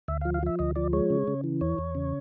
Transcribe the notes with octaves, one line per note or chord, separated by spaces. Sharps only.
D2 E5
F3 F5
F5
F3 E5
D2 D#5
F3 D5
G#3 C#5
C#3
C#3
E3
E2 C#5
E2
C#3